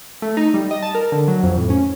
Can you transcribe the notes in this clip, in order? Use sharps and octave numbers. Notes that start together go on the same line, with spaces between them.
A3
D#4
G3
D#5
A5
A#4
D3
F#3
F2
A2
C#4